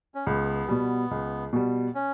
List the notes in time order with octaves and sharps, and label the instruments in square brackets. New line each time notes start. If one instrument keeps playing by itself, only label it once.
[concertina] C#4
[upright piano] C#2 [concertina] B3
[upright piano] B2 G3
C#2
B2 G3
[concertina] C#4